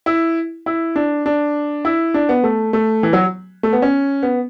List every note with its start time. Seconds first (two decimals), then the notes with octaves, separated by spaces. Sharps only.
0.06 E4
0.66 E4
0.96 D4
1.26 D4
1.85 E4
2.14 D4
2.29 B3
2.44 A3
2.73 A3
3.03 E3
3.13 F#3
3.63 A3
3.73 B3
3.82 C#4
4.23 B3